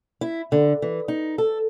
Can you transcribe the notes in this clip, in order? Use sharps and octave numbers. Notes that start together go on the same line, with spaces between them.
E4
D3
E3
D#4
A4